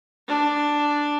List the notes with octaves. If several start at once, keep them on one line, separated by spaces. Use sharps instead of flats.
D4